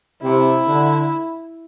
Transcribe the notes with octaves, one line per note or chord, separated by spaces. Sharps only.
C3 E4
D3